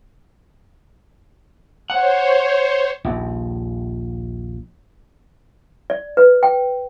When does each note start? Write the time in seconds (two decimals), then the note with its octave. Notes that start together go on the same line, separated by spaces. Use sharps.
1.90 C5 C#5 F#5
3.05 A#1 D#2
5.90 D5
6.17 B4
6.43 G5